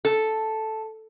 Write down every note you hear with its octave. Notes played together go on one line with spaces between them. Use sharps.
A4